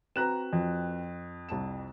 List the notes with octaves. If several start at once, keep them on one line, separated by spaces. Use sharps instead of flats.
C4 F#4 B4 A#5 F#6 E7
F2
C2 A5 E7